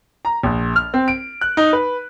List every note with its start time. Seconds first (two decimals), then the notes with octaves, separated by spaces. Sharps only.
0.25 A#5
0.43 A#1
0.76 F6
0.94 C4
1.08 D7
1.41 F#6
1.57 D#4
1.73 B4